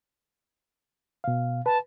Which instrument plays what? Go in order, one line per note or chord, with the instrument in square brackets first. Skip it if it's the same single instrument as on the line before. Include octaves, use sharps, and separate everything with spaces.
[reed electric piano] B2 F5
[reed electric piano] B4 [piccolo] A5